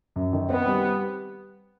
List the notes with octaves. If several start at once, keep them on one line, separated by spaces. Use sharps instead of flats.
F#2
D#3
B3 C4
G3